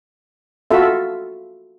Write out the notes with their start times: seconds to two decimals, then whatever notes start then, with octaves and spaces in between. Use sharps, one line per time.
0.71 F4 F#4 A4 E5